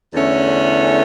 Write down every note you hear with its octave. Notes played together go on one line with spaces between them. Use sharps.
E2 D3 A3 C#4